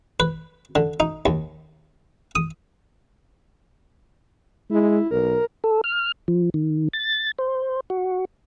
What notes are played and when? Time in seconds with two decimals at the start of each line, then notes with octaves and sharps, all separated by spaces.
0.20 B4
0.75 D3
1.00 D#4
1.26 D#2
2.35 D#6
4.70 G#3 E4
5.11 B1 A#4
5.64 A4
5.84 F6
6.28 F3
6.54 D#3
6.93 A6
7.38 C5
7.90 F#4